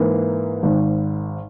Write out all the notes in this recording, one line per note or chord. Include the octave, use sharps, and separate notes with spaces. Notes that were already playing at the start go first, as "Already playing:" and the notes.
Already playing: G#2 E3 A#3
G#1 G#2 D#3